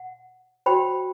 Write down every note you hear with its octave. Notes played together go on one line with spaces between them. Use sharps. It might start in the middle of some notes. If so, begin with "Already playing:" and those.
Already playing: F#5
F#4 C5 G5 B5